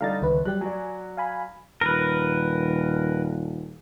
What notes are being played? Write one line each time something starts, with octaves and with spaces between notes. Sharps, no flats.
D3 G3 D#4 F5 A#5 A6
G1 C#2 D#3 B4
F#3 G3 G4 F#6
F#3 F#4 D5 G#5
F5 G#5 B5
D#1 A#4 B4